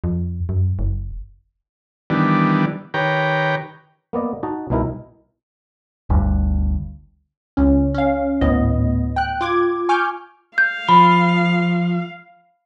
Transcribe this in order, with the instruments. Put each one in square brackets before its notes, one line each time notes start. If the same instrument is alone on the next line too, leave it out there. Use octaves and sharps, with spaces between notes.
[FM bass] F2
F#2
F#1
[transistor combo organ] D#3 E3 G3 B3 D4
D#3 G4 B4 C#5 G5 A#5
[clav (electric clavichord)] A#3 B3 D5 D#5
D#4 F#4 D#5 A5
C2 B2 D#4 E4 A#4
[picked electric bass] G1 D2 G2
[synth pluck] C#2 C#4
C#4 F5
G#1 D2 A2 B3 D#5
G5 F#6
F4 D6 G#6
G#5 C#6 D6 F6 G6
[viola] F5 [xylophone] G6
[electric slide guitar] F3 [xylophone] B5